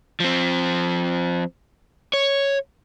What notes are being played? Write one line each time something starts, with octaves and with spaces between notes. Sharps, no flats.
F3 C4
C#5